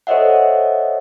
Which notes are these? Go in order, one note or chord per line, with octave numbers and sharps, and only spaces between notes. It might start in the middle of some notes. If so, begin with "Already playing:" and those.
A4 C5 C#5 D#5 E5 F#5